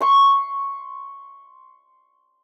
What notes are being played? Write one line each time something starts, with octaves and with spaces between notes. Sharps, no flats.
C6 C#6